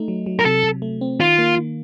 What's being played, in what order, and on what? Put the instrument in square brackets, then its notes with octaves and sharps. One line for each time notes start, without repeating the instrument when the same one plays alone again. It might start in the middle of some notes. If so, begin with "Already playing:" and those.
Already playing: [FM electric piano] A3 D#4
F#3
F#3
[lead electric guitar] A#4
[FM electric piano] C3 [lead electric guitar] A4
[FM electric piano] C3
A3
C4
[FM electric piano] D#3 [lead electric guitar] F4
[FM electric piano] A#3
D#3